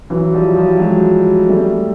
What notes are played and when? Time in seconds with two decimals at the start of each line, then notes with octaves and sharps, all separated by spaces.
0.10 E3 F#3
0.33 F3 G3
0.49 F#3
0.56 F3 G3
0.79 F#3 G#3
1.49 G3 A3